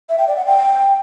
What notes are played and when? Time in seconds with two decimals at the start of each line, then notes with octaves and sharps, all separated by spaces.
0.09 E5
0.18 G5
0.28 D5
0.37 F#5
0.46 G5